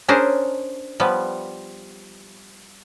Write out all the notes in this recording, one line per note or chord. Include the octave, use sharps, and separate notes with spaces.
C#4 D4 G#4 A#4 C5
F3 G3 B3